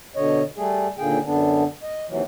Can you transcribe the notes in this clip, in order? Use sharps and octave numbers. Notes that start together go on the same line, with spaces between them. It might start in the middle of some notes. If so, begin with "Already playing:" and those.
B2 D3 C#5 D#5
G3 A3 G#4
D#2 A#2 D3 A#3 G#4 G5
F#2 D3 B3 D4
D#5
D#2 C3 E3 F#3